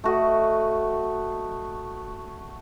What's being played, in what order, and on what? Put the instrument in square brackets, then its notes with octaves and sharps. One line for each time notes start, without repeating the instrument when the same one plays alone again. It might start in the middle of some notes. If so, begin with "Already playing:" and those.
[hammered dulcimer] A3 F#4 D#5